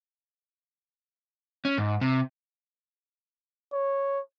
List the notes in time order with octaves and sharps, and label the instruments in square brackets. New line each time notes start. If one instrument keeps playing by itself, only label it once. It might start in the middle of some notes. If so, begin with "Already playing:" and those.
[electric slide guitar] C#4
G#2
C3
[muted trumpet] C#5